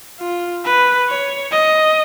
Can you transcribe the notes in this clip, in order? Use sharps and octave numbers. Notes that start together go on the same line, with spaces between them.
F4
B4
C#5
D#5